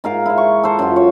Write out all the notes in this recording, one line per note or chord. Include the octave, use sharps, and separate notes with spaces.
G#2 A#4 F5
E4 C5
C#6
A4 C5
F#2 F4
C#5